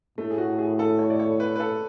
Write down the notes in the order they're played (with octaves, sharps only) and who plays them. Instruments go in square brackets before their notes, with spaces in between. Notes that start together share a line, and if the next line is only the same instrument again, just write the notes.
[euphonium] A2 [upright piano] A3
[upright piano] G#4
F#4
G#4
A4
C#5
D5
C#5
B4
B4
A4